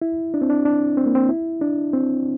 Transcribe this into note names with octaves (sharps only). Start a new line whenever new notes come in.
E4
D4
C4
D4
D4
C4
A#3
C4
E4
D4
C4